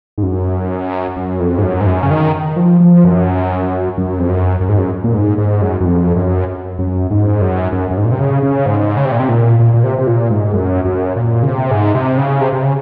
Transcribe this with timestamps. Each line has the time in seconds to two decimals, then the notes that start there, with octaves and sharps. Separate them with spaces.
0.18 G#2
0.23 F#2
1.17 F#2
1.40 F2
1.58 G#2
1.63 F#2
1.81 G#2
1.86 F#2
2.03 C#3
2.11 D#3
2.56 F3
2.80 F3
3.04 F#2
3.97 F#2
4.19 F2
4.29 F#2
4.60 F#2
4.69 G#2
4.78 F#2
5.04 A#2
5.14 G#2
5.38 G#2
5.62 F#2
5.80 F#2
5.85 F2
6.16 F#2
6.79 F#2
7.11 G#2
7.41 F#2
7.72 F#2
7.91 F#2
7.97 G#2
8.05 A#2
8.12 C3
8.20 C#3
8.43 C#3
8.66 G#2
8.97 C#3
9.05 C3
9.12 A#2
9.20 C3
9.29 A#2
9.59 A#2
9.74 A#2
9.84 C3
9.99 C3
10.07 A#2
10.30 G#2
10.54 F#2
10.85 F#2
11.16 A#2
11.43 C#3
11.47 C3
11.71 G#2
11.95 C3
12.18 C#3
12.41 C3
12.53 C3
12.63 C#3